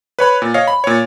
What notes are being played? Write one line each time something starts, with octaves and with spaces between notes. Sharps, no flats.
B4 C#5 B5
A#2
C#5 D#5 F5
B5
A#2 C#5